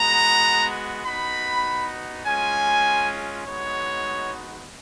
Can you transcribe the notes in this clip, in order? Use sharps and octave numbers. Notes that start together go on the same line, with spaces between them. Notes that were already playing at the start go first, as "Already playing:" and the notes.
Already playing: G#3 B3 F#4 A#5
B3 D#4 F#4 B5
G#3 C#4 F4 G#5
G#3 B3 D#4 F#4 C#5